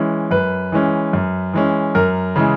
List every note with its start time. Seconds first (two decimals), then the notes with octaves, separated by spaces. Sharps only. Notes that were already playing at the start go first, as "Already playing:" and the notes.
Already playing: E3 G#3 C#4
0.31 F#2 B4
0.72 E3 G#3 C#4
1.13 F#2
1.53 E3 G#3 C#4
1.95 F#2 A#4
2.36 C#3 E3 G#3